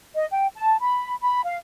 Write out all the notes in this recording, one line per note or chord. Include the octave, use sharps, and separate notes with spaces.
D#5
G5
A5
B5
B5
F5